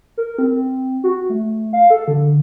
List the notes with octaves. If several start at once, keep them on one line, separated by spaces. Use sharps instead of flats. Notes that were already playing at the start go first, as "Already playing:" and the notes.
A#4
C4
F#4
A3
F5
A4
D3